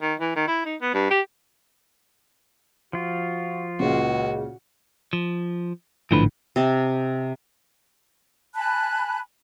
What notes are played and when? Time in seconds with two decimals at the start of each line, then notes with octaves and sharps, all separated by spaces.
0.02 D#3
0.20 E3
0.36 D#3
0.48 E4
0.66 D#4
0.81 B3
0.94 G2
1.11 G4
2.93 F3 F4 F#4
3.80 C#2 A#2 C#3 F#4
5.13 F3
6.11 G#1 A2 D3 E3 F3 B4
6.56 C3 D#5 A5
8.55 G#5 A5 B5 F#6